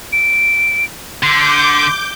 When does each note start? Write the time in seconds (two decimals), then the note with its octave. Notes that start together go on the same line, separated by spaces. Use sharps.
0.13 D7
1.23 D3 C6 D6 G6